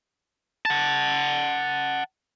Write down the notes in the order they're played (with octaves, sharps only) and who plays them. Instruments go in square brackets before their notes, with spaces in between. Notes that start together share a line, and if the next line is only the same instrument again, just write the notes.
[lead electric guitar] F#5 A5